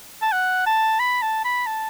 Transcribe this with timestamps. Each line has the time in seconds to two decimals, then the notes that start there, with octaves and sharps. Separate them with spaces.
0.22 A5
0.32 F#5
0.66 A5
1.00 B5
1.22 A5
1.45 B5
1.67 A5